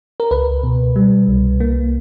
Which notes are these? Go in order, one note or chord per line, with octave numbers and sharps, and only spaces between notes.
A#4
C#2 B4
B2
G3
C2
A#3